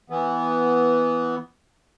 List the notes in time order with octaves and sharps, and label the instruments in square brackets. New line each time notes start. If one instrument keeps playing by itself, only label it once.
[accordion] E3 B3